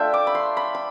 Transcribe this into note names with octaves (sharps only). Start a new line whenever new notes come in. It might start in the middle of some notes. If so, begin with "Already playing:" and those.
Already playing: A3 D4 F4 D5 E5 G5
D6
B5
C6
B5
B5